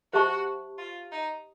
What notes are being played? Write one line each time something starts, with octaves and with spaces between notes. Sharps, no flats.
F#4 G4 C5 E5 A5 C#6
F4
D#4